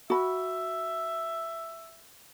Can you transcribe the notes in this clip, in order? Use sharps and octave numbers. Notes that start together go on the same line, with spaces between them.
F#4 E5 B5